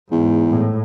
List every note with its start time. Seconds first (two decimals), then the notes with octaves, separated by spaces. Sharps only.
0.11 E2 G#2
0.51 A2